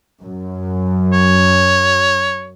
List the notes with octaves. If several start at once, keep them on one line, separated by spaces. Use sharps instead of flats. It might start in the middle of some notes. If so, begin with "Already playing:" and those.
F#2
C#5